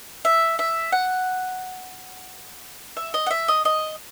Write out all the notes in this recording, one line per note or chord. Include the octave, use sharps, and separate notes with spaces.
E5
E5
F#5
E5
D#5
F#5
E5
D#5
D#5